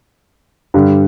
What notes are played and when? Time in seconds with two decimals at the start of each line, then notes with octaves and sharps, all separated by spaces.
0.74 G2 D3 G3